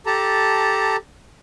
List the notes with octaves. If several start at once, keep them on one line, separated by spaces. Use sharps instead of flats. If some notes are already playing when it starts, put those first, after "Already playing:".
G4 A4 A5 A#5